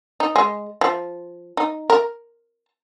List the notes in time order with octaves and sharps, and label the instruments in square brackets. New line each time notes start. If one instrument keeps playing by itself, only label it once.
[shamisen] D#4
G#3
F3
D#4
A#4